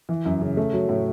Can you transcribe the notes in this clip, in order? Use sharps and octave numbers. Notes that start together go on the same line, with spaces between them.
E3
F#2
C#3
A3
F#3
A2